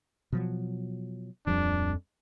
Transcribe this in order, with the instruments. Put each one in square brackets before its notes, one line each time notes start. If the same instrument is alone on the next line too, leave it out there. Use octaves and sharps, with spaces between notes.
[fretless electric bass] B2 F3 F#3
[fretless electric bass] D1 F3 G3 [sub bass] F2 [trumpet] D4